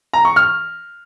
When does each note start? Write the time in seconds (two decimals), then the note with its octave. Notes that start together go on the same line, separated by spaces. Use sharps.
0.13 A#5
0.25 C#6
0.36 F6